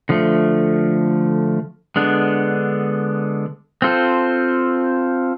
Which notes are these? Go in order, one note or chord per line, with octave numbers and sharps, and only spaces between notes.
D3 F3 A3
D3 G#3 B3 D4
C4 F4 A4 C5